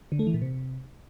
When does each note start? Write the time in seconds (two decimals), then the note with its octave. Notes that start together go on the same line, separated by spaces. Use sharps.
0.12 D3
0.19 A3
0.27 E3
0.34 A#2
0.42 C3